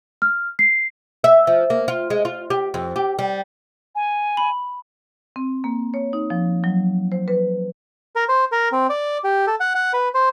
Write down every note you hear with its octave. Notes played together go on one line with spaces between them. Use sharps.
F6
C7
E5
F3
A#3
F4
G#3
F4
G4
F2
G4
G3
G#5
B5
C4
A#3
C#5
D#4
F3
F#3
C5
B4
A#4
C5
A#4
C4
D5
G4
A4
F#5
F#5
B4
C5